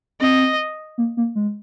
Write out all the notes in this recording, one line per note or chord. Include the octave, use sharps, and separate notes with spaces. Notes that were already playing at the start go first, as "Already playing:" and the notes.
C4 D#5
A#3
A#3
G#3